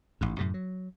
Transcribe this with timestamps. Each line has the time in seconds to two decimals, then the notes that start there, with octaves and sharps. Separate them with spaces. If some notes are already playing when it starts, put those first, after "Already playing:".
0.21 A1 G#2
0.38 F#2 A2 C3
0.54 F#3